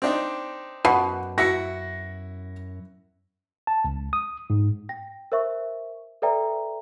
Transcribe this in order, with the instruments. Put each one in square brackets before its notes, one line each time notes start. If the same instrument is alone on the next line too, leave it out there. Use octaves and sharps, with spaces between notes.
[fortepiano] C4 D4 D#4
[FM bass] F#2 [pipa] B2 [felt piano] F#5
[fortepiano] E4 F#4 E5 [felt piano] A#6 C#7
[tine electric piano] A5
C#2
D#6
G#2
[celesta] G5 A#6
A#4 C5 E5 C#6
A4 B4 D5 E5 G5 A#5